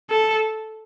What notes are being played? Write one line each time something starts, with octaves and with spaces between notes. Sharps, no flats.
A4